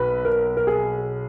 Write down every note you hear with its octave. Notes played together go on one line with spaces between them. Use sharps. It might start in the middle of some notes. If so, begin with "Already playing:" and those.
Already playing: B1 B4
A#4
A#4
G#4